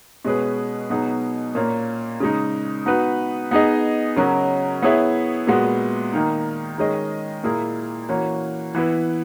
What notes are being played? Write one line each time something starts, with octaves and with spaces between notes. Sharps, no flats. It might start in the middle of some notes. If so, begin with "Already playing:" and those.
B2 G#3 C#4 G#4 B4
B2 F#3 B3 D#4 G#4
A#2 A#3 C#4
C#3 G#3 D#4
B3 D#4 F#4 B4
B3 D#4 G#4 D#5
C#3 F#3 C#4 F#4 A#4
B3 E4 G#4 C#5 E5
A#2 G#3 B3 F#4
D#3 A#3 D#4
D#3 G#3 C#4 G#4 D#5
A#2 A#3 E4 G#4
E3 A#3 C#4 F#4
E3 B3 E4 B4